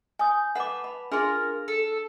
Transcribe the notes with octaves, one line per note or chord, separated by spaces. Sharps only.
G#5 D#6 G6
B4 F#5 A5 D6
B5
D4 F4 G#4 A#4 C6
A4